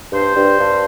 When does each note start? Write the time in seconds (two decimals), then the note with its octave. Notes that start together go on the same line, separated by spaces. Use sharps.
0.13 G2 C5
0.36 G2
0.59 G2